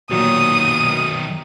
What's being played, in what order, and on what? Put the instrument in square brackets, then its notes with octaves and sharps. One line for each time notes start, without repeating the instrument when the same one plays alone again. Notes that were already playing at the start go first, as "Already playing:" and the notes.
[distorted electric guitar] B1 D#3 [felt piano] A#2 F#3 [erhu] D#6